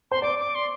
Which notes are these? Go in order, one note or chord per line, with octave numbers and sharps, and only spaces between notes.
C5 C6
D5 D6
D6
C6